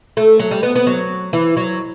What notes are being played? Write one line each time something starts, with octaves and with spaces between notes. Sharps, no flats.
A3
F#3
G3
B3
B3
F#3
E3
F#3